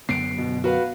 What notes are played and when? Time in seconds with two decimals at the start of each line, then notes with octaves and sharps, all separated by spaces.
0.09 F#2 D3 B3 C7 D7
0.38 B2
0.64 F#4 B4 F5